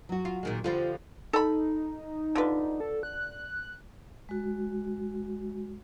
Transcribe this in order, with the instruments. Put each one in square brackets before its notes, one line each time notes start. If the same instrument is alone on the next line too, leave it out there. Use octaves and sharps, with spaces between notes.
[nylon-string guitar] F#3 F#4
[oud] F4
A#2 D#3 G#3
[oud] D3 F3 G3 [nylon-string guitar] F4
[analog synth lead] D#4 [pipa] A4 B5
[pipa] D3 F4 B4
[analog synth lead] A4
F#6
[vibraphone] G#3 F#4